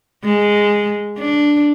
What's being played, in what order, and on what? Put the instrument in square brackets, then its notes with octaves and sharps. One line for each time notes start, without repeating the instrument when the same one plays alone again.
[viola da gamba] G#3
D4